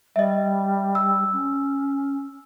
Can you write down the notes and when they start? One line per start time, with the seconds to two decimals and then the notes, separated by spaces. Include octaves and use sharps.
0.16 G3 D#5 E5
0.95 E6
1.33 C#4